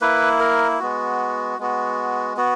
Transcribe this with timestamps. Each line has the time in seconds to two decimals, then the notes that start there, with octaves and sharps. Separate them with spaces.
0.01 A#3 E4 B4
0.40 A#4
0.79 G#3 B3 F#4
1.58 G#3 B3 F#4
2.37 B3 F#4